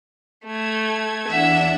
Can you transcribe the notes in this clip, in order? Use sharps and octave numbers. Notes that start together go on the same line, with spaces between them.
A3 G#6
E2 D4 E5 F#5